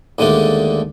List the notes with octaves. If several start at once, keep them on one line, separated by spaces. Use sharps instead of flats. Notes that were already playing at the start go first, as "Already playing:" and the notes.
D#2 D3 G#3 A3 D4